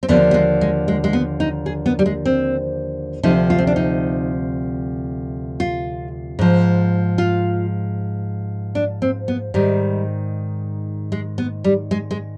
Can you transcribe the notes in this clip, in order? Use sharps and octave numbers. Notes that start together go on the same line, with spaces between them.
C4
D#2 D3 F3 B3
B3
G#3
G#3
G#3
G#3
B3
D#4
G#4
B3
G3
G#3
C4
D2 C3 F3 D#4
F4
C4
D4
D#4
F4
G#2 F3
F4
D4
C4
B3
G#2 D#3 G3
G#3
B3
G3
G#3
G#3